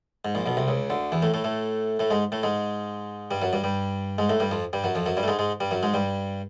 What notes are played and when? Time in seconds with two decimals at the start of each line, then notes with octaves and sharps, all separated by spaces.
0.25 G#2
0.35 A#1 A#2
0.46 B1 B2
0.57 C2 C3
0.68 C#2 C#3
0.90 D2 D3
1.12 E2 E3
1.22 A2 A3
1.34 A2 A3
1.44 A2 A3
1.99 A2 A3
2.11 G#2 G#3
2.32 A2 A3
2.43 G#2 G#3
3.31 G2 G3
3.42 F#2 F#3
3.53 G2 G3
3.64 G2 G3
4.18 G#2 G#3
4.29 A2 A3
4.40 G2 G3
4.51 F2 F3
4.73 G2 G3
4.84 F#2 F#3
4.95 F2 F3
5.06 F#2 F#3
5.17 G2 G3
5.23 A3
5.28 G#2 G#3
5.39 G#2 G#3
5.60 G2 G3
5.71 F#2 F#3
5.83 G#2 G#3
5.94 G2 G3